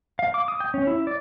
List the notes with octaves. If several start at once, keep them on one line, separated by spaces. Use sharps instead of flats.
F5
D6
D#6
G5
C#4
E4
D5